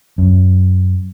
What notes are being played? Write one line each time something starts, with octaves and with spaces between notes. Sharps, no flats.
F#2